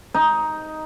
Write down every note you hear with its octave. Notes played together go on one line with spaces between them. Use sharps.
D#4